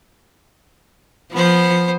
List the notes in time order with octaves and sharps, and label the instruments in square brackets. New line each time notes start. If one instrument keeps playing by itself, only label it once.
[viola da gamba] F3 [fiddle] B3 C5